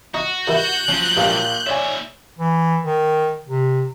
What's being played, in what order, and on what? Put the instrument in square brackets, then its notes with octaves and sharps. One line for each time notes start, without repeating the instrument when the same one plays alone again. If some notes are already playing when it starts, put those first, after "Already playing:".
[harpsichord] D#4 [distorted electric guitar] F#4
[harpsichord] G2 D#3 E4 [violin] F#6 G6
[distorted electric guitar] F3 F#3 [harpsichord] C#4
[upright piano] A#1 A#2 A#3 [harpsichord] G2
[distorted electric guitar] D#2 E5 [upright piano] C#5 D5 G#5
[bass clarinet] E3
D#3
C3